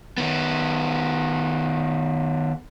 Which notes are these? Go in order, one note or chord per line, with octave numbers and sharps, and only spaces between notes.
D#3 B3